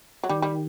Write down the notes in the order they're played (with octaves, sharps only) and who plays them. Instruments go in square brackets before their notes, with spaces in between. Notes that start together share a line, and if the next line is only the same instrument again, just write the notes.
[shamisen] F#3
[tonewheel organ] D#3 [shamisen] G3
[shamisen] G3